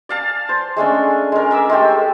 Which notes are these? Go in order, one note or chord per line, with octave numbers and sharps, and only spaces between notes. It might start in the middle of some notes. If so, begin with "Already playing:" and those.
D5 F5 A5
C5
G#3 A3 C#4 D4
G#3 A#4
A#4 E5 D6 E6
G#3 A3 G4 A4